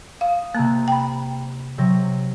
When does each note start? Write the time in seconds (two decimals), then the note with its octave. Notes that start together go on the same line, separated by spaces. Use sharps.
0.21 F5 D#6
0.55 C3 A#3 A#5 F#6
0.88 G5 B5
1.78 C3 F#3 A#6